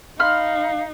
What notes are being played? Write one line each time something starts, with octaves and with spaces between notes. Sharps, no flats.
D#4 F5 B5 C6 F6